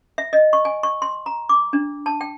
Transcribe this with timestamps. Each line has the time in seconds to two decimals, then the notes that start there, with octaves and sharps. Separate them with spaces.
0.18 E5
0.33 D#5
0.53 C#6
0.65 G#5
0.83 C#6
1.02 C6
1.26 A#5
1.49 D6
1.73 D4
2.06 A5
2.21 G5